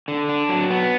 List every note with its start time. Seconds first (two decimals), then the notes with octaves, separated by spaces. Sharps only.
0.08 D3
0.29 D4
0.49 F#3
0.70 B3